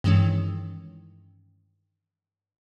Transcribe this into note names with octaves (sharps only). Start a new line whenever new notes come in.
G2 D#3 E3 G#3 C#4